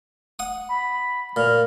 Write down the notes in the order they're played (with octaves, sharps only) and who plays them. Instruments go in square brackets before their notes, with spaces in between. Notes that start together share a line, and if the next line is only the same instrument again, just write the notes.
[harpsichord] F#5 D#6
[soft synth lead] B5
[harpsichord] A#2 [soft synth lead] F6